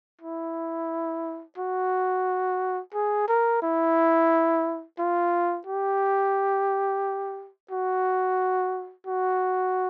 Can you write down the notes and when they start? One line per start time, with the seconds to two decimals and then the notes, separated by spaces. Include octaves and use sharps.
0.22 E4
1.58 F#4
2.94 G#4
3.28 A#4
3.63 E4
4.99 F4
5.67 G4
7.71 F#4
9.07 F#4